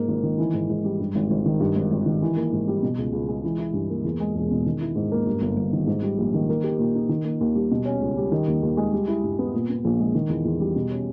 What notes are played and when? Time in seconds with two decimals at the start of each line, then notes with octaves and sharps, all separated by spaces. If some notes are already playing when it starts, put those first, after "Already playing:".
Already playing: G#2 A#3
0.08 G#1
0.23 D#3
0.38 E3
0.54 G#2
0.70 G#2
0.84 G3
1.00 G2
1.15 G#1
1.30 G#1
1.46 D#3
1.60 G2
1.75 G#1
1.91 G#1
2.06 D#3
2.22 E3
2.36 A#3
2.52 G#2
2.67 G3
2.83 B2
2.99 C#2
3.13 C#2
3.28 G#3
3.44 E3
3.58 E4
3.74 G2
3.90 A#3
4.04 E2
4.20 G#3
4.35 E1
4.51 B2
4.66 D#3
4.80 E4
4.96 G#2
5.12 A#3
5.27 G2
5.41 G1
5.57 G1
5.73 D#3
5.87 G#2
6.02 G3
6.18 A#1
6.34 D#3
6.49 A#3
6.64 G4
6.79 A#2
6.95 D#4
7.09 D#3
7.24 A#3
7.41 D#2
7.56 G3
7.71 B2
7.85 C#4
8.01 C#2
8.17 G3
8.32 D#3
8.48 D#2
8.63 D#2
8.77 G#3
8.92 G3
9.08 E4
9.24 G2
9.39 B3
9.54 A#2
9.69 B3
9.85 A#1
9.99 G#3
10.15 D#3
10.29 E2
10.45 E2
10.60 G3
10.76 B2
10.91 C#4